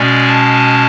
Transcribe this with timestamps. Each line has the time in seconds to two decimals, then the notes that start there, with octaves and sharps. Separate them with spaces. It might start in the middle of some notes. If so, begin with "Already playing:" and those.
Already playing: B2 G#3 C#4 D5
0.27 A5